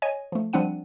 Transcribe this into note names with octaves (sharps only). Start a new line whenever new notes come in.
C#5 D#5 G#5
F3 A3
F3 G3 C4 D4 F#5 D#7